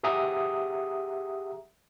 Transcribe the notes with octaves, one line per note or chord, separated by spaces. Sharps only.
G4 G#4 E5 F#5 A#5 D#6